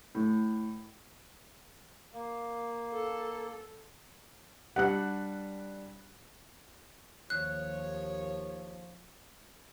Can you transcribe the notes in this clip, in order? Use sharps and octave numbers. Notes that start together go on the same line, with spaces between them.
A2
A#3
A4
G3 D4 F#5 F#6
D#2 F3 C#5 F#6